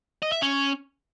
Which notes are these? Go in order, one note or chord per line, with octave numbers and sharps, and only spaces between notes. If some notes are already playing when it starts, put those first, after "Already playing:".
D#5
E5
C#4